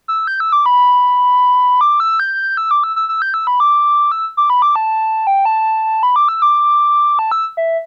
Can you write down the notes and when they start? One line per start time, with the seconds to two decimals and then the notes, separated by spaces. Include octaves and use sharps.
0.08 E6
0.27 G6
0.40 E6
0.52 D6
0.66 B5
1.81 D6
2.00 E6
2.20 G6
2.57 E6
2.71 D6
2.84 E6
2.96 E6
3.09 E6
3.22 G6
3.34 E6
3.47 B5
3.60 D6
4.12 E6
4.37 D6
4.50 B5
4.62 D6
4.76 A5
5.27 G5
5.45 A5
6.03 B5
6.16 D6
6.28 E6
6.42 D6
7.19 A5
7.32 E6
7.57 E5